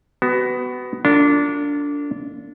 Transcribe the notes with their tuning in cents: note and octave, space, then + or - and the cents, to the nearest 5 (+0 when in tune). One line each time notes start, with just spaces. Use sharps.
B3 +15 F#4 +25
D4 -20 F4 +0 A4 +45